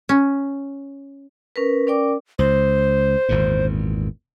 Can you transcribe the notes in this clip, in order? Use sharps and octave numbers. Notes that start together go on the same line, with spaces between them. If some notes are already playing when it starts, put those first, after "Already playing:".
C#4
C#4 A#4 B4
C#4 A#4 D5 G5 D6
C#2 C5
G#1 E2 A#2